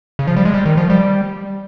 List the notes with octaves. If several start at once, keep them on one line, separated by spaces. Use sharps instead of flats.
C#3
F3
G3
G#3
G3
D#3
F3
G3